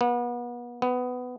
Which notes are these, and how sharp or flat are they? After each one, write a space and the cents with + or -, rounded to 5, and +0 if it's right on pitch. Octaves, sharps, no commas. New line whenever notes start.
B3 -35
B3 +15